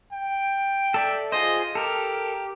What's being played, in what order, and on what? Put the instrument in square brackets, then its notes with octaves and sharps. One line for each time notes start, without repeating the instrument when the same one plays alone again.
[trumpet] G5
[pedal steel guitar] A4 D5 E5
[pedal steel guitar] F4 G#4 C5 [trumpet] D#5
[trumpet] G4 [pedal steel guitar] A4 A#4